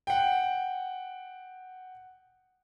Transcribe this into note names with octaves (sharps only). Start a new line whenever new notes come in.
F#5 G5